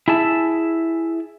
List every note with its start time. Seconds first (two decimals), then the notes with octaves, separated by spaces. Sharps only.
0.08 E4 G#4 E5 A5